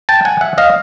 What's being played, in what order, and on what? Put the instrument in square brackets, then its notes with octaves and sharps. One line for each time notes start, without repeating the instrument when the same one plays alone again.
[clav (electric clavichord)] G5 A5
F#5 G#5
E5 F#5
D#5 F5